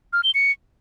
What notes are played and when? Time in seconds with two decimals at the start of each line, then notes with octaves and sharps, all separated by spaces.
0.13 F6
0.24 G7
0.34 C#7